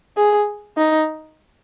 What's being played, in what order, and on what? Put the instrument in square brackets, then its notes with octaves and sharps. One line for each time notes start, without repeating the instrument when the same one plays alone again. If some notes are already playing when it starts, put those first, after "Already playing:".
[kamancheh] G#4
D#4